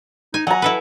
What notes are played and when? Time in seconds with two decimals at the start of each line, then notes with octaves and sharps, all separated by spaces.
0.34 D#4 G#5
0.47 F#3 F#5 G#5 A#5
0.62 E4 A4 B4